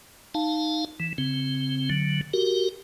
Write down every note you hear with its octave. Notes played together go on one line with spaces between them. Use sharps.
D#4 F5 A5
E3
C#3 C4
D3 F#3
F#4 G4 A#4